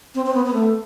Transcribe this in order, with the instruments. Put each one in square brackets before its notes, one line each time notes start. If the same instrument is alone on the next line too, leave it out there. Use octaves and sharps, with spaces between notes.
[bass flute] C4
C4
B3
B3
A3